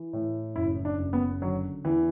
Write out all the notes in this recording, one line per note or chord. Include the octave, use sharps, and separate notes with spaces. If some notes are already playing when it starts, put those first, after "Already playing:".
Already playing: E3
A2
F#1 E4
D4
F#1
B3
D3 F#3
E2 E3